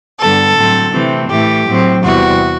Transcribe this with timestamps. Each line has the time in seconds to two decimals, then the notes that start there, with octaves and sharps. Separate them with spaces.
0.19 G2 D3 G3 B3 A4
0.55 A2 F#3 C4
0.92 C3 E3 A3 C4
1.29 A2 E3 A3 G4
1.67 A2 F#3 C4
2.02 E2 C3 E3 G3 F#4